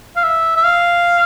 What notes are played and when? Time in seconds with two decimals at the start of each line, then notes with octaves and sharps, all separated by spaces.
0.16 F5
0.23 E5
0.57 E5
0.65 F5